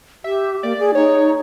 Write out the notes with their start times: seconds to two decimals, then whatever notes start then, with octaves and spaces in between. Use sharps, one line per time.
0.24 G4 E5
0.63 A#3 D5
0.79 G#4
0.95 D#4 C#5